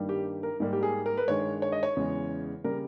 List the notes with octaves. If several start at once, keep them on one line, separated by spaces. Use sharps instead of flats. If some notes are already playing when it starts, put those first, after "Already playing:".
Already playing: G2 D#3 G3 A#3
G4
A#4
G#2 G3 A#3
G4
G#4
A#4
B4
G2 D#3 G#3 C#5
C#5
D#5
C#5
E2 C#3 G#3
C#3 G3 A#3 A#4